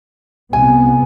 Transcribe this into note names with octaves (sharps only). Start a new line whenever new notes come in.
C2 C3 B3 G#5